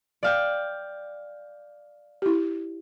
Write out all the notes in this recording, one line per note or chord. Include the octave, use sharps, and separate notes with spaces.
D5 F5 G5
E4 G4